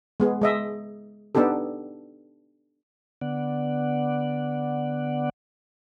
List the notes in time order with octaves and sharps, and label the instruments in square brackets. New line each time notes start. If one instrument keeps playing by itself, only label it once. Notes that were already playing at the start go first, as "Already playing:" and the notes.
[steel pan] G#3 B3 G#4
G#3 D#5 E5
B3 D4 D#4 G4 A4
[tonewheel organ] D3 B3 D5 F#5